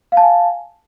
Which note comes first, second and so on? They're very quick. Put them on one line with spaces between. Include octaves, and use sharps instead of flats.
F5 A5 G#5